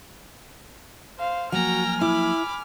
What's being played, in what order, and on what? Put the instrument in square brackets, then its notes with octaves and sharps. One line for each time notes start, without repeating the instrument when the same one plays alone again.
[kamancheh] C5 F5
[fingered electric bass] F3 F#3 A#3 [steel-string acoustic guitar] F#4 [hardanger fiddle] G5 A#5 [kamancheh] G#5 F6
[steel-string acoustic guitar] E4 [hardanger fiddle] B5 D6